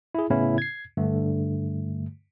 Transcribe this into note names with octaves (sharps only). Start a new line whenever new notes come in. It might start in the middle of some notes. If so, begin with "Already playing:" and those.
E4 G#4
A2 C#3 B3 C#4 E4
G#6 C7
G2 D3 A3